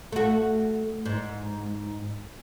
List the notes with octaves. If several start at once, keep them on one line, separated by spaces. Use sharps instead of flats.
A3 F#4
G#2